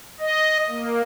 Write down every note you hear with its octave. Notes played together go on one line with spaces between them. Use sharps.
D#5
A#3